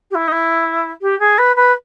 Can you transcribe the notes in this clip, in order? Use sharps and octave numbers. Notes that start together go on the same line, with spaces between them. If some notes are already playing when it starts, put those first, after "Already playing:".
G4
E4
D#4
E4
G4
G#4
B4
B4